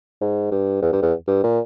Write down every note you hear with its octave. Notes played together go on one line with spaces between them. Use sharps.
G#2
G2
E2
G2
E2
G2
A#2